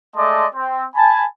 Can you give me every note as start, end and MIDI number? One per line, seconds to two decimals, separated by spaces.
0.16 0.46 56
0.16 0.46 57
0.16 0.46 74
0.16 0.46 75
0.16 0.46 81
0.16 0.46 84
0.55 0.85 60
0.95 1.25 80
0.95 1.25 81
0.95 1.25 83